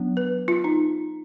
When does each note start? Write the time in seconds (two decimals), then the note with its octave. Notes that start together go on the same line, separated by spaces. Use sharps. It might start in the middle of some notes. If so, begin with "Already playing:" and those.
Already playing: F#3 B3 D4
0.17 B4
0.48 F4
0.64 D#4